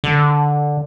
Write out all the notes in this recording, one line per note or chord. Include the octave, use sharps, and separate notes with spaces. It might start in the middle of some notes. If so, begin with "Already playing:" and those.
D3